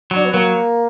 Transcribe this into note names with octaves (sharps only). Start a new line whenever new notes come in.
F#3 D4
B3
F#3 A#3